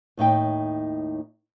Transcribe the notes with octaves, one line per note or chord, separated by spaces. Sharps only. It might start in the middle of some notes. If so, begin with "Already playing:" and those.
D#2 A2 D#4 G5